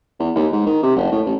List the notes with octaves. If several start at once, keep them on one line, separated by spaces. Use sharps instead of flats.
E2
D#2
G#2
D#3
C3
F#1
A2
A1